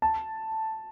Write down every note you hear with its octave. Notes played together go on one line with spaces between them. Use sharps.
A5